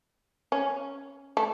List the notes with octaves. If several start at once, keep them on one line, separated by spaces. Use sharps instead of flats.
C#4
A3